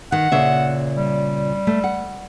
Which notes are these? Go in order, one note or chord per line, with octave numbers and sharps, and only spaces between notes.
D#3 F#5
A#2 C#3 E5
G3
A3
F#5